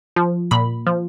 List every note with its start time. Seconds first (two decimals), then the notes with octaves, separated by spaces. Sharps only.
0.16 F3
0.51 A#2 B5
0.87 F3